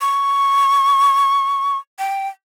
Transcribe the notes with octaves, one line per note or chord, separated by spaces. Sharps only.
C#6
G5